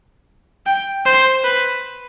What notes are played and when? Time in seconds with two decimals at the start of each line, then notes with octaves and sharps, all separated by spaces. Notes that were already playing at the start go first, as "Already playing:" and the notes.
0.67 G5
1.06 C5
1.44 B4